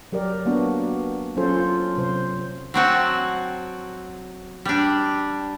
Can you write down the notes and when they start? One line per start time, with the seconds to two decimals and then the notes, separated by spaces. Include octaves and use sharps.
0.12 F#3 G4 A#4 D5
0.46 A#3 B3 D4 F#4
1.37 F#3 C#4 F4 A4 C5
1.56 F4
1.97 C3 F#3 C5
2.74 F#3 C4 F#4 A5
4.65 G3 D4